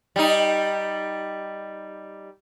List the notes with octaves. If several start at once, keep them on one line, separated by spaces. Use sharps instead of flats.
G3 D#4